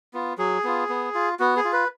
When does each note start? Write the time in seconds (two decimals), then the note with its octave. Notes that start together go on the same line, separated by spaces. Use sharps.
0.14 B3 F4
0.38 F#3 G#4
0.64 B3 F4
0.89 B3
1.15 F4
1.39 B3 F#4
1.56 G#4
1.64 F4
1.73 B4